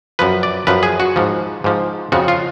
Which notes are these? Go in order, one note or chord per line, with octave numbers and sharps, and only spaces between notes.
F#2 F3 B4
D5
F#2 F3 B4
G#4
F#4
G#2 F3
G#2 F3
F2 C#3 F3 F#4
F4